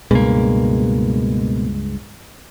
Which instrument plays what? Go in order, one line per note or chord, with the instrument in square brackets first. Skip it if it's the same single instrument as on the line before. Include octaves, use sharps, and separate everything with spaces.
[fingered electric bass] C#2 G2 G#3 [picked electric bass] B2 A#3